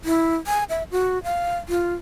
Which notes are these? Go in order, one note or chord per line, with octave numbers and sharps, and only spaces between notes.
E4
G#5
E5
F#4
F5
F4